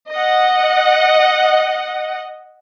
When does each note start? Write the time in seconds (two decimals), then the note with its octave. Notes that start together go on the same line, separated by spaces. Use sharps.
0.11 D#5 F#5